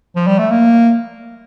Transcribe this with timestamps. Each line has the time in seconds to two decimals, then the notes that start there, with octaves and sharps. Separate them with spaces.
0.16 F3
0.27 G3
0.39 A3
0.51 A#3